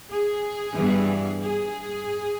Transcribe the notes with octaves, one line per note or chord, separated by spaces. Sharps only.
G#4
G2 E3 G3 B3
G#4